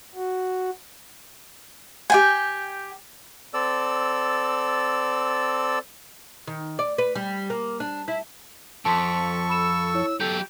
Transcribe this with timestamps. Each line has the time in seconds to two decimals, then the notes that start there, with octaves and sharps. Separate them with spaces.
0.15 F#4
2.10 G4 G5 G#5
3.54 C4 A4 D5 E6
6.47 D#3
6.79 D5
6.98 B4
7.15 G3
7.50 A#3
7.80 D4
8.08 E4
8.85 F2 A4 A5 C6 C#6 B6
9.49 B5 E6 E7
9.94 E4 C#5
10.20 F#3 G4 A4 G6